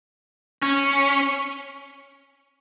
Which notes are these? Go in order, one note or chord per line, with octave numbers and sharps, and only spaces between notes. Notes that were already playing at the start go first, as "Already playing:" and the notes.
C#4